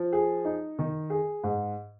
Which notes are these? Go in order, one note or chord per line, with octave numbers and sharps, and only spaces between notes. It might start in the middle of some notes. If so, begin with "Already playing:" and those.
Already playing: F3
G#4
D#4
D#3
G#4
G#2